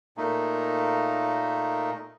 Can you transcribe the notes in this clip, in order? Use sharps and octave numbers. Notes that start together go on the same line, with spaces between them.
A#2 A3 A#3 D#4